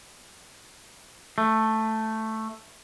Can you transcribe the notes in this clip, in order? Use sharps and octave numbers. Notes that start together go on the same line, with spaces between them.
A3